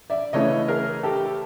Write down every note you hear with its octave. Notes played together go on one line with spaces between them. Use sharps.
D5 E5
C#3 E3 A3 C#4 C#5 D#5
G#4 A#4
G4 A4